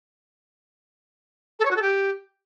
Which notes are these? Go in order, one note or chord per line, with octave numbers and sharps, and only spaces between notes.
A4
C#5
F#4
A4
G4